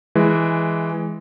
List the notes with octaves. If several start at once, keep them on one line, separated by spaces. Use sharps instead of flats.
E3 G#3